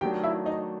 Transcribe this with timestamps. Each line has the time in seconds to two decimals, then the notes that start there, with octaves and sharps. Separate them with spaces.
0.01 D#3 F#3 A3 D4 G4 G5
0.23 E4 E5
0.45 D#4 D#5